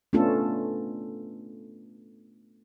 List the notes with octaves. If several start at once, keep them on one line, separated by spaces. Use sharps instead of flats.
A3 B3 C#4 D4 F4 A4